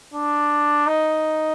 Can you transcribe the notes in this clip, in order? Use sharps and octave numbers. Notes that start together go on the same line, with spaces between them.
D4
D#4